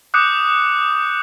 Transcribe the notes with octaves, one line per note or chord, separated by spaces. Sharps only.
D6 D#6 F#6 G6 C#7 E7